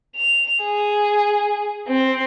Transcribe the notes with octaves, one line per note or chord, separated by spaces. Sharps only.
F7
G#4
C4